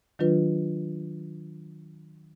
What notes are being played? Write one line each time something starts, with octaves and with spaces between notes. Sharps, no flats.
D#3 F#3 D4 F4 B4